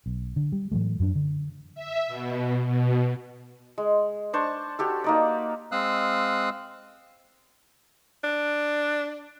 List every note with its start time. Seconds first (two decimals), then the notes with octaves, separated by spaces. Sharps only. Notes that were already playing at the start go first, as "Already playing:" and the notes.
0.06 B1
0.36 D3
0.52 G3
0.72 A2 E3 F#3 A3
1.00 F#2 F#3 A3 D4
1.15 D3
1.75 E5
2.08 B2
2.66 B2
3.78 G#3
4.33 D4 C5 A5 C#6
4.79 F#4 G4 A4
5.04 A#3 D#4 D5
5.72 G#3 C4 F5 D#6 E6 F#6
8.24 D4